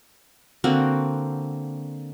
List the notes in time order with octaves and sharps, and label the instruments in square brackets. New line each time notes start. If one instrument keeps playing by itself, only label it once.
[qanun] D3 A#3 C4 F#4